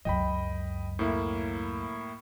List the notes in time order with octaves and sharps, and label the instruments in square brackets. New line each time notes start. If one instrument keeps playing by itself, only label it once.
[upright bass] C#2 F#2 [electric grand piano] D#5 G5 B5
[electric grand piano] A2 A#3 E4